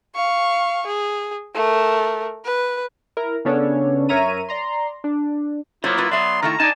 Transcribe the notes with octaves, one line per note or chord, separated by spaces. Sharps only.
F5 C#6
G#4
A3 A#4
B4
E4 A#4
C#3 B3 C#4 D4 A4 C#5
F#2 A#4 C#5 E5 A#5 D#7
D5 A#5 C6
D4
F#3 A#3 B3 E4 F4 C5 C#5
F4 B4
F#3 B3 D5 E5 C6
D#3 A3 E4 F4 A#5
D#4 D5 G#5 A5